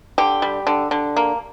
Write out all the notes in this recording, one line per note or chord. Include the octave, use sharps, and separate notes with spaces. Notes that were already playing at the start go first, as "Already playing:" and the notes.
D3 G4
G3
D3
D3
A#3